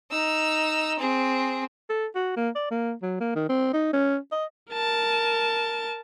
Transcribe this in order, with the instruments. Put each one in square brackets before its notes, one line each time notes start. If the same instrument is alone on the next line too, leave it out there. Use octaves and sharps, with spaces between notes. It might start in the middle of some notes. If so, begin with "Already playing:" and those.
[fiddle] D#4 E6
C4 G#4
[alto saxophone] A4
F#4
A#3
D5
A#3
F#3
A#3
D#3
C4
D#4
C#4
D#5
[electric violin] A#4 A5